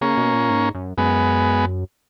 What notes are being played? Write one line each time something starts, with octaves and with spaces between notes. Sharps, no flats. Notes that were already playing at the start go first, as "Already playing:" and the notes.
C#3 A#3 C#4
B2
A#2
G#2
F#2
F#2 G#3 B3